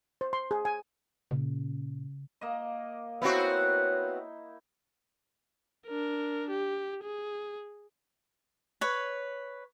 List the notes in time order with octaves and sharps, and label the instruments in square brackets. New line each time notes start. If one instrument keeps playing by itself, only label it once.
[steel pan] C5
C6
G#4
G#5
[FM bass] A#2 [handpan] C#3
[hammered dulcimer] A#3 D#5
[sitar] B3 C4 F#4 [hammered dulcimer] D#4 E4 [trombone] C#5
[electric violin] D4 A#4
G4
G#4
[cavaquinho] B4 C#5